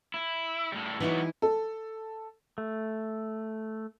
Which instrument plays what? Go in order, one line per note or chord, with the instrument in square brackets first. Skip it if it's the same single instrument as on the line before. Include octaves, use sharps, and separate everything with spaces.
[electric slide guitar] E4
A2 G3
[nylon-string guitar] E3 D#4 E4 [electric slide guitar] F#3 G3 B3
[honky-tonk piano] A4
[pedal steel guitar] A3